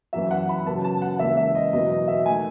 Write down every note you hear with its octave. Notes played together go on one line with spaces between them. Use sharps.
F#2 E3 B3 E5
F#5
B5
F#2 C#3 F#3 B3 A5
A5
F#5
D#2 C#3 E3 G#3 B3 E5
E5
D#5
E2 B2 F#3 B3 D#5
D#5
E5
D#3 A3 G#5